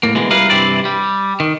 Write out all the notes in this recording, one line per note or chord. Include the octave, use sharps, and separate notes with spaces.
A2 A#3
B2 D3 E3 G#3
C#2 G3 E4 A#4 B4 F5
G2 C3 E3 C4 E4 D5
G3
D#3